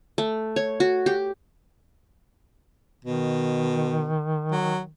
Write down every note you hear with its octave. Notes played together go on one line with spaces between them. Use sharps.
A3
C#5
F#4
G4
B2 D#3
F#3